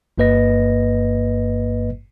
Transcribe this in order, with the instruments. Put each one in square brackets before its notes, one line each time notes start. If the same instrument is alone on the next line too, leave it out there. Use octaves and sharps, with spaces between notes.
[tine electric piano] G1 G2 A#3 B4 D#5 A#6